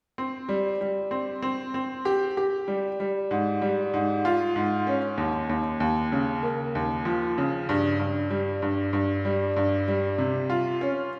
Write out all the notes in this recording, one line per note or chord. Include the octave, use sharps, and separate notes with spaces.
C4
G3
G3
C4
C4
C4
G4
G4
G3
G3
G#2
G3
G#2
F4
G#2
C#4
D#2
D#2
D#2
C#3
A#3
D#2
F3
C#3
G2
G2
G3
G2
G2
G3
G2
G3
C3
F4
C#4